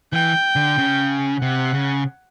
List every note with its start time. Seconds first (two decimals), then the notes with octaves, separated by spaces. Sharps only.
0.13 E3 G5
0.56 D3
0.78 C#3
1.42 C3 F#5
1.74 C#3